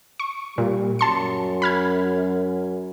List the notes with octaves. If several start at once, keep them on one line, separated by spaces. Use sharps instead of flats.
C#6
A#2 G3
F#2 A5 C6 C#7
B5 F6 G#6